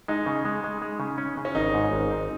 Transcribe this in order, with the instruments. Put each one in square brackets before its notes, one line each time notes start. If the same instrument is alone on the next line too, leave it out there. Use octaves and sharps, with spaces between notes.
[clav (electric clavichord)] G#3 [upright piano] D#4
[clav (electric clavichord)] C#3
G#3
G#3
G#3
C#3
C#4
C#3
[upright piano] C#4
[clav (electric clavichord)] G#1 [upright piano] D#4
[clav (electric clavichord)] G#2
G#1
C4